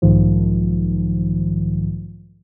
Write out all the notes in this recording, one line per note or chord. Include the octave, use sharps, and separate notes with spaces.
B1 G#2 D#3 F3